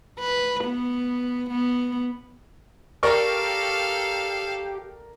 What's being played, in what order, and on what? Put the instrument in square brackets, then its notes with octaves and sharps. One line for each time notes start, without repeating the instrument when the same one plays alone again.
[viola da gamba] B4
B3
B3
[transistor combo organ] G4 [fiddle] A4 F5 [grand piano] A#4 D5 C#6